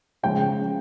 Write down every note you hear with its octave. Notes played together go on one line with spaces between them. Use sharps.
C#3 F3 G#3 G5